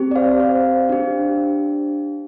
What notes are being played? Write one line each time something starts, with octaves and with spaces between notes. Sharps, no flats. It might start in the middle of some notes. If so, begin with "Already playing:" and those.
Already playing: C4 G4
D5
C5 F5
C5 F5
D4 G4